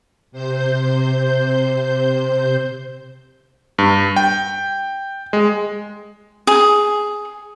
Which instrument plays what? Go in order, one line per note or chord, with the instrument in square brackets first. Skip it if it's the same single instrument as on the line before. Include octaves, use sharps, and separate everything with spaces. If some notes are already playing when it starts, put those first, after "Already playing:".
[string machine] C3 C5 G6
[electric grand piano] G2
G5
G#3
[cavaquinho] G#4